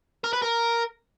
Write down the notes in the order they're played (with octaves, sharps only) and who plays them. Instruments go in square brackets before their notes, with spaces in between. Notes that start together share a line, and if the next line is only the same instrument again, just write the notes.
[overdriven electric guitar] A#4
B4
A#4